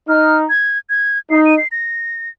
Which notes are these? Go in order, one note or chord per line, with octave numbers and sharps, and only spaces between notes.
D#4 F6
G#6
G#6
D#4 C7
D#7
C7
A#6